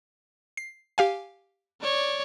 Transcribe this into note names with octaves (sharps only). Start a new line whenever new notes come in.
C7
G4 F5 G#5
C#5 D5